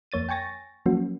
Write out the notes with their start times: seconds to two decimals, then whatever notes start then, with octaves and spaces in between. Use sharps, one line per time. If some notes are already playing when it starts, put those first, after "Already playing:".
0.12 F2 A#3 C#5 A6 D#7
0.29 G5 G#5 C#6 A6 A#6
0.86 F3 F#3 A#3 C#4 F#4